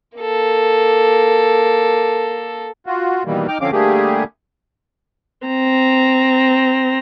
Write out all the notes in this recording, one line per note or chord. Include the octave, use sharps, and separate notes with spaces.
A#3 A4
F4 F#4
B2 D#3 E3 G3 A#3
D#4 G5 D6 F6
D3 F3 C4 C#4 F5 D6
D3 G3 A3 A#3 G4 G#4
C4 A#5